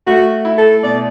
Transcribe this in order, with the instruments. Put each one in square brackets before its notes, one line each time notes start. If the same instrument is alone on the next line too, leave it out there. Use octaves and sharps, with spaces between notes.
[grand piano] A3 [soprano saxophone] F#4
[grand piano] E4
[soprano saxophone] A4
[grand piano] B2 [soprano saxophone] D5